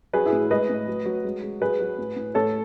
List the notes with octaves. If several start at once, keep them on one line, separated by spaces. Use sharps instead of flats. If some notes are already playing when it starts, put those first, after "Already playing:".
F#3 G#4 B4
E4 G#4
A2
G#3 B4 D#5
A2
F#3
F#3
G#3
G#3
F#3 G#4 B4
F#3
A2
A2
A2 A4 C#5